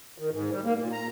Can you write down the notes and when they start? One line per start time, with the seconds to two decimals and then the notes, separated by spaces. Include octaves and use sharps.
0.18 D#3
0.31 G#2
0.51 G3
0.65 A#3
0.79 A#2
0.92 A#5